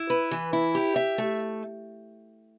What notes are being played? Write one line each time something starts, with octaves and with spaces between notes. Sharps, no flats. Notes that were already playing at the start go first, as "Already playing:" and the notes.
Already playing: E4
B4
E3
E4
G4
E5
A3